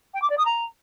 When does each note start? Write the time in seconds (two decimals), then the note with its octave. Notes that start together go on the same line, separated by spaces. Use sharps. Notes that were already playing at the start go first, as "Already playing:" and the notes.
0.14 G5
0.22 D6
0.29 D5
0.37 D#6
0.45 A#5